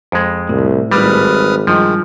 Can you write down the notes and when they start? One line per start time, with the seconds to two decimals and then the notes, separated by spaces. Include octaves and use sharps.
0.12 F2 G#3
0.49 C2 A2
0.92 G#1 G3 B4 D#6 F6
1.67 G2 D#3 F3 G#3